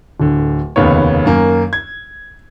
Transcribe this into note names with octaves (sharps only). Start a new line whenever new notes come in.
D1 D3
F1 D#2 C#3 B3 C#5
F#2 D#3 A#3
G#6